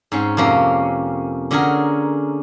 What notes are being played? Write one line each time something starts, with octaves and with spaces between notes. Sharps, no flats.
G#2 C4 C#4
F2 C3 A#3 C#4
D3 C#4 F#4 G#4 A#4